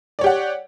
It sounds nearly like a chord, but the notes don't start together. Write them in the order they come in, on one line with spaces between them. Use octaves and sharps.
D5 C#5 G4 F#5